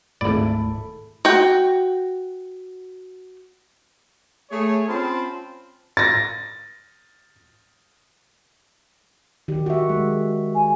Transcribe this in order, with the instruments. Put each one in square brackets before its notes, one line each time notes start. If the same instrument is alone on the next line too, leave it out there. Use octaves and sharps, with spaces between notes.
[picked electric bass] D1 G#2 A3 [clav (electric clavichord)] G#1 D5 [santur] E4 A4
[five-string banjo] F#4 G5
[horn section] A3 G#4 C#5
C4 C#4 F4 C5 A5 B5
[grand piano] A6 A#6
[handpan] D#3 G4
F#4 E5
G#3
[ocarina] G#5